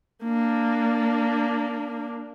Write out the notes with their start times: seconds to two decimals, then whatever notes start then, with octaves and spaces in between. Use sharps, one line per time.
0.24 A#3 D4